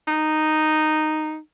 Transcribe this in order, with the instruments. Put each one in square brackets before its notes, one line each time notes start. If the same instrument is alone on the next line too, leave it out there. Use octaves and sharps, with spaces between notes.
[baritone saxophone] D#4